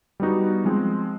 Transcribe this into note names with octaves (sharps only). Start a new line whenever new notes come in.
G3 B3 D#4 F#4
F3 G#3 C4